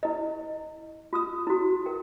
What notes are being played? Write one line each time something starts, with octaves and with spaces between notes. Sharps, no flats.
E4 D#5
F4 D#6 E6
E4 F#4
A#4 G5